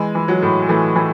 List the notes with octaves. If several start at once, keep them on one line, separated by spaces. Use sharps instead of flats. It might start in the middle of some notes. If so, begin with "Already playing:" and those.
Already playing: E3 G#3
E3
F#3
A2
E3 A3
E3